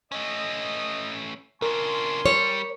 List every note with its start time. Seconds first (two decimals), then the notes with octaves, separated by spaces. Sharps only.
0.12 A3 C#4 D#5
1.62 C#3 D4 F4 A#4 G#5 C6
2.26 G3 C#5